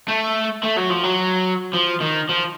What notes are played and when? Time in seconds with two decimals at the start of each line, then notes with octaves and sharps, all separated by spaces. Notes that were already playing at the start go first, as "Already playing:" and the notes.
0.08 A3
0.64 A3
0.77 F#3
0.90 F3
1.03 F#3
1.75 F3
2.02 D#3
2.30 F3